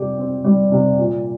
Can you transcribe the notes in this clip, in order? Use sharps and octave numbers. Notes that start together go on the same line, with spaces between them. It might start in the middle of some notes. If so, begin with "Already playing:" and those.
Already playing: C3 G3 G4
C4
G3
C3
A#2